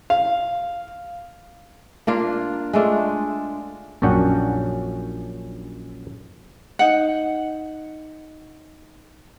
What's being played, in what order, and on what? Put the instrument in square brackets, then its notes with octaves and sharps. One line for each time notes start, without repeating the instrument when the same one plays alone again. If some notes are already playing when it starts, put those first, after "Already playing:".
[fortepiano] F5
[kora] A#3 D4 F4
G#3 A3 D4 F4
[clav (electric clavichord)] A#1 F#2 C#4 D4 F#5 G5
[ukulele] D#4 F#5